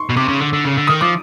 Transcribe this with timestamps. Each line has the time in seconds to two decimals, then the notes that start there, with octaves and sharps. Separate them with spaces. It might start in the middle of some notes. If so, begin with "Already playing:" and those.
Already playing: C6 C#6
0.09 B2
0.16 C3 D6
0.28 C#3
0.40 D3
0.53 D3
0.65 C#3
0.77 D3
0.87 D#3 D#6
1.01 F3 D6